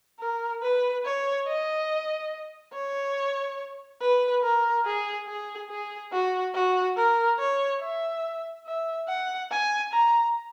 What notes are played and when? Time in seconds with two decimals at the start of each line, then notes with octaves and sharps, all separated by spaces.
0.19 A#4
0.62 B4
1.05 C#5
1.47 D#5
2.74 C#5
4.01 B4
4.43 A#4
4.85 G#4
5.28 G#4
5.69 G#4
6.12 F#4
6.55 F#4
6.97 A#4
7.39 C#5
7.81 E5
8.66 E5
9.08 F#5
9.51 G#5
9.93 A#5